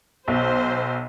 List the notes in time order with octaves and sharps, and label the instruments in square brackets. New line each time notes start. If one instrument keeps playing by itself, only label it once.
[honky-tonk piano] B1 [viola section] C5